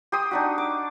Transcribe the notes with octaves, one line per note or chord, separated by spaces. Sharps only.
G4 C6 D#6
D4 D#4 F#4
D6